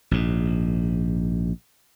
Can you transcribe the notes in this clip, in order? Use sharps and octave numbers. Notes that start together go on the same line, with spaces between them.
A#1 G#2